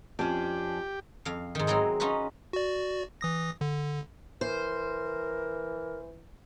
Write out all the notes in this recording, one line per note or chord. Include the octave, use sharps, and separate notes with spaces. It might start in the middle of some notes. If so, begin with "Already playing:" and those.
F2 C#4 D4 G4
F2 F5
G#2 D#3
F#3 G#3 C4 D#4 E4
C#4 D#4 F4 F#4 B4
F#4 D5
E3 D#6 A#6
D3
E3 A#4 C5